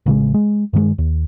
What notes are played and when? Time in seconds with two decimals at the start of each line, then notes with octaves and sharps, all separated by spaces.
0.06 A1 C#3 G3 G#3
0.34 G#3
0.73 G2 D#3 F#3 G#3
0.98 D#2